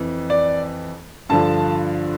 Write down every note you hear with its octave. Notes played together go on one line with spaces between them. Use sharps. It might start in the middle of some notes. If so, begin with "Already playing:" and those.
Already playing: F2 E3
D5
G2 D3 F3 A5